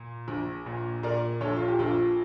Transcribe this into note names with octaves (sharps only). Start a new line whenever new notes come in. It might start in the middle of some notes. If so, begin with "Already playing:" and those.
Already playing: A#2
A#1
A#2
A#2 A#4 D5
A#1 A4 C#5
F4
G4
A#1 F4 A4